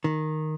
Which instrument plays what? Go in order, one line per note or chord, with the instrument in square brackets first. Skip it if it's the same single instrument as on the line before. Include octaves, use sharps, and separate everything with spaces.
[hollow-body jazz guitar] D#3